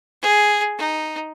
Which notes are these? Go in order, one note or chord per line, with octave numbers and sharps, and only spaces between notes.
G#4
D#4